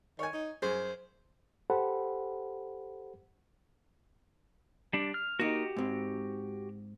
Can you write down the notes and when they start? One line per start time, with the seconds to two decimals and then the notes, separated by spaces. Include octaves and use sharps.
0.19 D#3 C#5 G#5
0.33 D#4
0.62 F#2 G#4 C5
1.70 G4 A4 C5 F#5 B5
4.93 G3 D4
5.14 F6
5.40 A#3 D#4 F#4 G4
5.76 G#2 C4